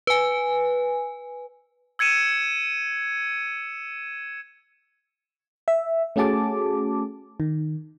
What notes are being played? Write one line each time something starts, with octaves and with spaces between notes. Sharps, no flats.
B4 G#5
E6 G#6 C#7 D#7 E7
E5
A3 C#4 F#4 G#4 A5 D6
D#3